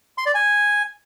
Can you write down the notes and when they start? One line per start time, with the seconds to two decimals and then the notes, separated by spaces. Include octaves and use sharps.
0.18 C6
0.26 D5
0.34 G#5